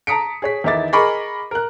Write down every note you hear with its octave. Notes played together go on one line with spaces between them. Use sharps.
A5 A#5 D#6 B6 C#7 D7
G#4 C#5 B6
E2 D#3 D#4 E4 D6 A6
G#4 A#4 D#5 B5 C#6 D6
A#4 F#6